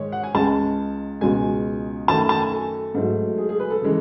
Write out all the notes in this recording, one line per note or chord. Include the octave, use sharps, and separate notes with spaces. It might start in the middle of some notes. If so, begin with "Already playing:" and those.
Already playing: G#2 D#3 G#3 C#5
F#5
G#5
C#2 C#3 G#3 A5
C#2 B2 G#3 G#5
F#2 D#3 A3 A5
A5
G#5
A4
G#2 F#3 A3
G#4
G#4
B4
A4
C#3 E3 G#3